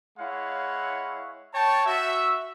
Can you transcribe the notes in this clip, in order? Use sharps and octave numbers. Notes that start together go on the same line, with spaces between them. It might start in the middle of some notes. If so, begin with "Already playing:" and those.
G#3 E4 C#5 F5 F#5
C#5 G5 A5
F#4 E5